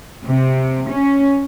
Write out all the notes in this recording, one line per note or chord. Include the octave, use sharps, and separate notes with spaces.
C3
C#4